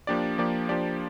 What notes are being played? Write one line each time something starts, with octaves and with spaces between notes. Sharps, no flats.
F3 A#3 D4 G4 D5
F3 A#3 D4 G4 D5
F3 A#3 D4 G4 D5